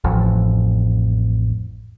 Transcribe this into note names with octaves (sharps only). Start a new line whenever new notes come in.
A1 F2